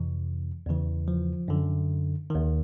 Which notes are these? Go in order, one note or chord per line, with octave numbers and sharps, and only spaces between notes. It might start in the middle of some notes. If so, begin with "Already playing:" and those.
Already playing: F2 C3 E3
E2 C#3 E3
F3
F#2 D3
D#2 D#3